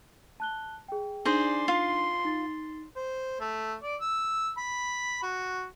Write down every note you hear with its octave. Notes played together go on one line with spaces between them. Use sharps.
A5 F#6 G7
G#4 G5
D4 D#4 G#4 C5 D5 C6 A#6
F4
D#4 A6
C5
A3
D5
E6
B5
F#4